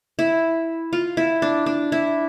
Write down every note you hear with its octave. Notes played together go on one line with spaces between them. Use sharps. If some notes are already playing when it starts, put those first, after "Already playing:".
E4
F4
E4
D4
D4
E4